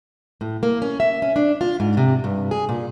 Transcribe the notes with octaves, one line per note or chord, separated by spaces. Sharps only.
A2
A#3
C#4
E5
C#4
D4
F4
G#2
C3
G2
G#4
A#2